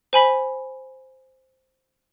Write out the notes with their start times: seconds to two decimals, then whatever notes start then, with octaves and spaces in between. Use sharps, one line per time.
0.13 C5 G#5 B5 B6